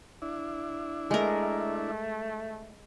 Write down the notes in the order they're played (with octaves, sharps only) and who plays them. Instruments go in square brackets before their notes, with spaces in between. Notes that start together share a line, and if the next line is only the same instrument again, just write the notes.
[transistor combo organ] D4 E4
[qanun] G#3 A#4 [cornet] A3